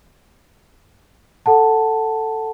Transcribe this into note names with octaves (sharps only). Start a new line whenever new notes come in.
A4 F#5 A5